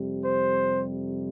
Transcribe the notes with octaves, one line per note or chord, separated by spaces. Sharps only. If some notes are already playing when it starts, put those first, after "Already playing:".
Already playing: F2 C3 G3
C5